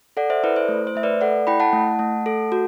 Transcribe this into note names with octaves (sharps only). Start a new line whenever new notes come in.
A4 D5 F#5
C5 E5
E4 B4 D5
C5
A3
C5
A3 E5
B4 D5
A4 D5 F#5
E4 G5 B5
F#5 A5
A3
A3
A4
F#4